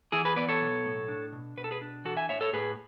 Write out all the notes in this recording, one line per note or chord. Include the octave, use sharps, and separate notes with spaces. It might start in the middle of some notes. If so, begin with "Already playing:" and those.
E3 E4 G#4
G#4 B4
B3 B4 D5
A4 C#5
B1
A2
D4
B2
B2 B4
A4
G#4 B4
D4
E3 F#4 A4
E5 G#5
A2 C#5 E5
A4 C#5
A2 G#4 B4